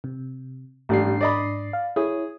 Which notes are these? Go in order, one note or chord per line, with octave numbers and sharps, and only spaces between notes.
C3
A1 G#2 G3 D4 C7
D5 D#5 B5
F5
E4 G#4 C#5